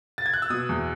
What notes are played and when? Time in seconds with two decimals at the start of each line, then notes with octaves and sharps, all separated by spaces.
0.18 A6
0.26 G#6
0.34 F#6
0.42 E6
0.50 B2 D#6
0.69 E2